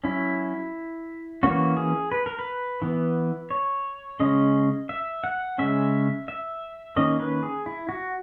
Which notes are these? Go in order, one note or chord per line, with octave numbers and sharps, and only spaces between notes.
F#3 C#4 E4
E3 A#3 C#4 F#4
G#4
B4
A#4
B4
E3 B3
C#5
C#3 G#3 C#4 D#5
E5
F#5
C#3 G#3 C#4 E5
E5
D#3 A#3 C#4 D#5
B4
G#4
E4
F#4